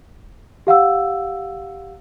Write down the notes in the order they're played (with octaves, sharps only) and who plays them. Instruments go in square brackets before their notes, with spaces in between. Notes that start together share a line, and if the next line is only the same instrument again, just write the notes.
[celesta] G4 F5 F#5 E6